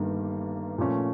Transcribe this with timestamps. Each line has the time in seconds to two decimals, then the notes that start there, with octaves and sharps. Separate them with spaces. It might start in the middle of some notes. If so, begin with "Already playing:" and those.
Already playing: G1 G2 D#3 G3 A#3
0.78 A#2 F3 A3 C#4